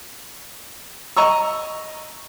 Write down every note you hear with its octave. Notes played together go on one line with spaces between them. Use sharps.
D#5 A#5 C#6 E6